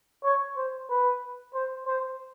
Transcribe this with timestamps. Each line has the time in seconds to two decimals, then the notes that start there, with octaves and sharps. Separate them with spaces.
0.24 C#5
0.57 C5
0.90 B4
1.54 C5
1.87 C5